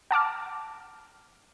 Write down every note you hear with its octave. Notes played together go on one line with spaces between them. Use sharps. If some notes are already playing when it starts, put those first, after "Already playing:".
F#5 A5 D6 F6